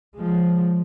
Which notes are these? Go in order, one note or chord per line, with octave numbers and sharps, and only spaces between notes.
F3 G#3